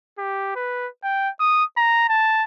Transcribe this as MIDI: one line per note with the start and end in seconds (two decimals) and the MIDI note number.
0.18 0.52 67
0.56 0.88 71
1.04 1.30 79
1.40 1.64 87
1.77 2.05 82
2.09 2.44 81